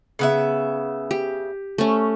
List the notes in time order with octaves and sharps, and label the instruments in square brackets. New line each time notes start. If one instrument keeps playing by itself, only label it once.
[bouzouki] C#3 B3 E5
[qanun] G4
A3 C#4